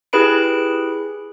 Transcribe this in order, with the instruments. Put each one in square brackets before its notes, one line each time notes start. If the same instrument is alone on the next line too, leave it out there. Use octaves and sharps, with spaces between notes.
[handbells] E4 G4 G#4 B4 B5 D7